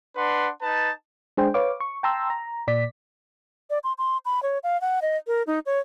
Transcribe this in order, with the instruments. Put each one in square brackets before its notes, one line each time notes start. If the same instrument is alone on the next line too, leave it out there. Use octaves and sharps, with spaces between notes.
[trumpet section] D4 B4 F#5 C6
D#4 B4 A5
[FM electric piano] G#3 D4 G#4 C5 G5
B4 C#5 F5 D6
C#6
G5 A5 A#5 C6 E6
A#5
A#2 D5 B6
[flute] D5
C6
C6
B5
C#5
F5
F#5
D#5
A#4
D#4
C#5